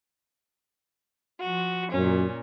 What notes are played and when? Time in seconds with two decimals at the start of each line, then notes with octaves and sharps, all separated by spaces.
1.40 F3 F#4
1.94 F#2 A#2 C#4